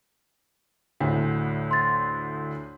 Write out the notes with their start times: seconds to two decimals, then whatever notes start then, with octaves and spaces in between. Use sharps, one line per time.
1.00 D2 A2 D3
1.71 C6 A6